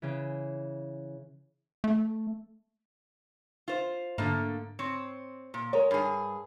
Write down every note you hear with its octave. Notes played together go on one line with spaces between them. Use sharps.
C#3 E3
A3
F4 C5
G#2 D3 A3 A#3
C4 C#5
A#2
G#3 A#4 C#5
G2 G#4